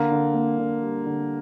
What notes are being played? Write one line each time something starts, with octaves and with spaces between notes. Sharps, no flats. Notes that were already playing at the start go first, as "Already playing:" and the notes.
Already playing: D3 A#3
D3
A#3
D3
G3
D3